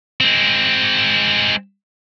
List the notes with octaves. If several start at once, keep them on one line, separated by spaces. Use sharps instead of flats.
G#3 C4